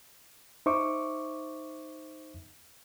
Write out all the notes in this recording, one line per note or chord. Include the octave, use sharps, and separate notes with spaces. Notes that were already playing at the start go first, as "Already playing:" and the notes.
D#4 C5 E5 C#6 D6